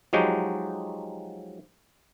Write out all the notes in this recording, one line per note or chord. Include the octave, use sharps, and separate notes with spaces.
F3 F#3 G#3 D#4 F#4 G4